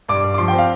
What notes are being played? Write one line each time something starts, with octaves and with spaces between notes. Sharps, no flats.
G2 D6
G2
D6
F3 C6
G5
C4
F5